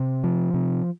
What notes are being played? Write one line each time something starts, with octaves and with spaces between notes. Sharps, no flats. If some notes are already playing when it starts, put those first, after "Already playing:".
Already playing: C3
F3
C3